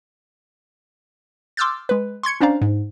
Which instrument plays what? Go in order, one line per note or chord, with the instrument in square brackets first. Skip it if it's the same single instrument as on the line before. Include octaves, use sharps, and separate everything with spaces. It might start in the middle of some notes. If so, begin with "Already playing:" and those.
[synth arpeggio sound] C6 D6 E6 F6 G6 A6
G#3 B4
C6 C#6 G#6 C#7
C#4 D4 C5 D5 F5 A#5
G#2